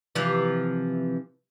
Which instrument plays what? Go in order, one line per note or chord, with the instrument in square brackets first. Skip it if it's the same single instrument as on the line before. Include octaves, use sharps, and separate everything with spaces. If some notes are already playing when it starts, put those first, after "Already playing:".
[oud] C3 E3 F3